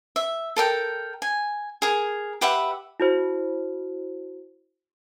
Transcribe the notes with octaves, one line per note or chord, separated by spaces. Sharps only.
E5
A4 A#4 G5
G#5
G#4 A#4
G4 B4 E5 F#5
E4 F#4 C5